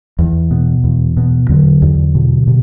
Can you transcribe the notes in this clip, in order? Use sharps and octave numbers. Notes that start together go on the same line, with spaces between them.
E2
B2
E2
B2
E2 D3 F#3
E2
B2
B2